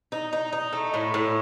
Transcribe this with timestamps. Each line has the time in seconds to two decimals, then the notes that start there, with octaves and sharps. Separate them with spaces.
0.12 D#4
0.33 D#4
0.53 D#4
0.73 A3
0.94 A2
1.14 A2